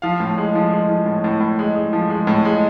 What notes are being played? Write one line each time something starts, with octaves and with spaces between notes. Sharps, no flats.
F3 F5
A2
G#3
F3
G#3
F3
A2
A2
A2
G#3
G#3
F3
G#3
A2
G#3